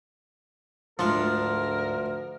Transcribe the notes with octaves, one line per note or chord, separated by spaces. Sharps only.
D2 G#2 F3 A3 D4 A#4